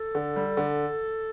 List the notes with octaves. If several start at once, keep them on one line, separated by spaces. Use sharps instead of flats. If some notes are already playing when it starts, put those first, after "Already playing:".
Already playing: A4
D3
G3
D3